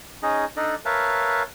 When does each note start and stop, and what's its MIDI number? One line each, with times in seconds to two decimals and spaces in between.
0.23 0.45 61
0.23 0.45 63
0.23 0.45 68
0.23 0.45 75
0.57 0.75 62
0.57 0.75 63
0.57 0.75 69
0.57 0.75 74
0.57 0.75 75
0.85 1.43 70
0.85 1.43 71
0.85 1.43 73
0.85 1.43 76
0.85 1.43 77
0.85 1.43 81